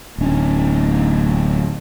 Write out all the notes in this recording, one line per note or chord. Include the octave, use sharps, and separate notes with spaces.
D1 C#4